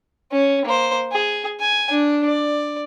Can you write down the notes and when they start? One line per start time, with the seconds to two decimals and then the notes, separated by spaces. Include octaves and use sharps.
0.32 C#4
0.65 A#3 C5
1.12 G#4
1.60 G#5
1.90 D4
2.25 D5